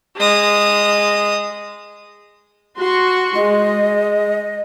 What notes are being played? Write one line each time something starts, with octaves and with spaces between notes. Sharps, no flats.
G#3 D#6
F#4 C6 C#6
G#3 D#5